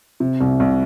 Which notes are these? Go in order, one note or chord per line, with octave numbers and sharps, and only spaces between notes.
C3
C2
C2